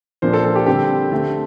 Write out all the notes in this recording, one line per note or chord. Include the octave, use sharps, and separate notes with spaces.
A#2 F3 A#3 D4 C5
A4
A4
G4
D3 G3 C4 G4
D3 A3 C4